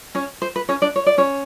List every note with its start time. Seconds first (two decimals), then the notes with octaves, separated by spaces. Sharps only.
0.15 C#4 C#5
0.42 C5
0.56 B4
0.69 C#4 C#5
0.82 D4 D5
0.96 C#5
1.06 D5
1.18 C#4 C#5